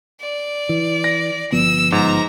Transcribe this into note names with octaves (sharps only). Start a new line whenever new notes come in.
D5
E3
A#6
G1 F3 B3 E6
G#2 A#5